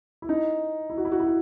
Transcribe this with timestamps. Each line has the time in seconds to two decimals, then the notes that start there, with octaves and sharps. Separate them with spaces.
0.22 E4
0.29 D#4
0.90 E4
0.97 F#4
1.05 E4
1.12 F#4
1.20 E4
1.26 F#4